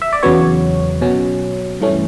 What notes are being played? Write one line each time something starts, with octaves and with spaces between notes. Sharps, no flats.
E5
D5
E2 C#3 F#3 B3 C#5
B2 F#3 C#4
G2 E3 A3 C#4